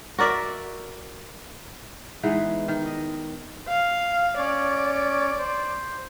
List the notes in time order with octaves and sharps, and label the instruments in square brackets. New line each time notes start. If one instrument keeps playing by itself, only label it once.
[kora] F#4 A#4 D5 E5
E3 G#3 B3 D#4
D#3
D#5
[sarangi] F5
[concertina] C#4 C#5 [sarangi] D5
[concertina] C5